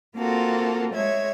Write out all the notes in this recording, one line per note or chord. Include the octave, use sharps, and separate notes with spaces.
A#3 C4 F4 F#4 A4 A#4
G#3 C#5 E5 G#6